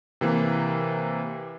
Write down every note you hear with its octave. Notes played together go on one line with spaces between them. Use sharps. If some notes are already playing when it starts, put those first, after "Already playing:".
C3 E3 A#3